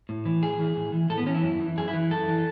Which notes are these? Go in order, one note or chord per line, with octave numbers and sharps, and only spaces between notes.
A2
E3
A2 G#4
E3
A2
E3
A2 A4
B3
E3 C#4
E4
F#2
E3
F#2 G#4
E4
E3
F#2 A4
E3